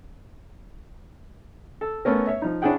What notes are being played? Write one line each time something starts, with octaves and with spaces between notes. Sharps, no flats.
A4
A3 B3 C#4 A#4
C#5 E5
F3 D#4
C#4 D4 E4 G#4 F#5 G5